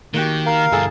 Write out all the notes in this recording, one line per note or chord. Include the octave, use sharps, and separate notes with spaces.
D#3 A#3 F#4 G4
A#4 F5
D2 G2 E4 G#4 A4